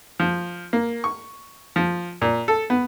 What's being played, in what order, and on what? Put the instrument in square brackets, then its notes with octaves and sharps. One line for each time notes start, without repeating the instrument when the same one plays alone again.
[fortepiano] F3
A#3
C#6
F3
A#2
A4
B3